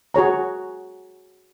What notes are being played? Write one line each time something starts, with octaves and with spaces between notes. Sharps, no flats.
F#4 G#4 C#5 A#5